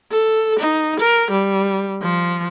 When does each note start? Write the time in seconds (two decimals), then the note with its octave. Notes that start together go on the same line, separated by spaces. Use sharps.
0.12 A4
0.59 D#4
1.00 A#4
1.31 G3
2.02 F3